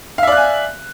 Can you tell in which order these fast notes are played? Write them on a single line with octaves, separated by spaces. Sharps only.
F5 E5 D5 F#6 G#5